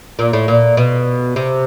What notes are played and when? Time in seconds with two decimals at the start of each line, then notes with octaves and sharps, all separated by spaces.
0.19 A#2
0.33 A2
0.48 A#2
0.77 B2
1.36 C3